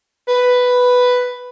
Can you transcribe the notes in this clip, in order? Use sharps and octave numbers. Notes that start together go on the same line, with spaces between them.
B4